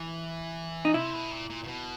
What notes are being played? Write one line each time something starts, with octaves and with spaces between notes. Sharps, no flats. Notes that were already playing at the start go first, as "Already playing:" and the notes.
Already playing: E3
D#4
C3 E4
B2
A#2
A#2
A#2
B2